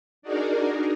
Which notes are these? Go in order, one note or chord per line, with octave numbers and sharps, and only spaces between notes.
D4 D#4 F#4 G#4 A#4 D5